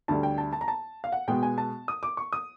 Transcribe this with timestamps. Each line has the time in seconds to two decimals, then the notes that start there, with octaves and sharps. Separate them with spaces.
0.08 D2 D3 G3 A5
0.23 G5
0.38 A5
0.53 A5
0.61 A#5
0.68 A5
1.04 F5
1.12 F#5
1.28 B2 G#3 B3 G5
1.43 G#5
1.58 A5
1.88 D#6
2.03 D6
2.17 C#6
2.33 D#6